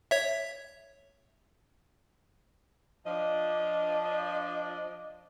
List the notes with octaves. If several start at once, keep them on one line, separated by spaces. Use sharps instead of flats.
C#5 E5
F3 D4 D#5